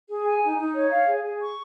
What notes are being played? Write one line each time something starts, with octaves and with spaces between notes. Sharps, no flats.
G#4
G#5
D#4
D#4
C#5
F5
G#4
G#4
C#6